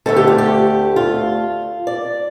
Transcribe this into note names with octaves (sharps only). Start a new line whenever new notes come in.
D2 D3 A3 A4
G4
F4
G4
F4
D5